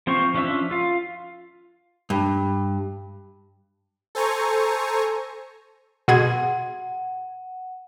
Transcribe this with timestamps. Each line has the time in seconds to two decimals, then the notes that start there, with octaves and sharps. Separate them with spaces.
0.07 F3 C4 C5 F5 C#6
0.34 F3 C#4 D4 E5 E6
0.71 F4 F5
2.10 G2
4.15 A4 C5 G#5 A#5 C#6
6.08 B2 G#4 F#5 G#6